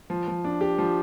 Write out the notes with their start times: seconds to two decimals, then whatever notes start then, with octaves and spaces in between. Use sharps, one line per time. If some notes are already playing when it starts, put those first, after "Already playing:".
0.10 F3
0.28 F3
0.44 D4
0.61 G4
0.78 F3